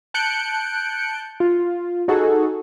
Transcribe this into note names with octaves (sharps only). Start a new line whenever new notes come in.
A5 F#6 G6 C#7 D7
F4
D#4 F#4 G#4 A4